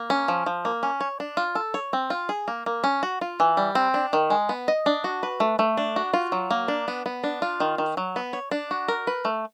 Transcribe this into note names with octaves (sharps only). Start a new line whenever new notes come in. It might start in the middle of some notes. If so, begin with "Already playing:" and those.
Already playing: A#3
C#4
F3
F3
A#3
C#4
C#5
D4
F4
A4
C#5
C4
F4
G#4
A#3
A#3
C#4
F#4
F4
E3
G3
C4
D4
D#3
G#3
B3
D#5
D4
F#4
B4
A3
A3
D4
F#4
F4
F#3
A#3
D4
B3
B3
D4
F4
D#3
D#3
F#3
B3
C#5
D4
F#4
A#4
B4
A3